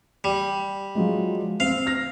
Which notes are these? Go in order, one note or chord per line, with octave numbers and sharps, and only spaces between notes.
G3
F3 F#3 G#3
C4 F5
F6 A#6